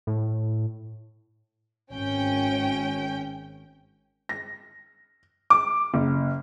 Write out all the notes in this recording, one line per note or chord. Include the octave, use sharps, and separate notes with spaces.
A2
G#1 C#4 G5
A#6
D6
F#1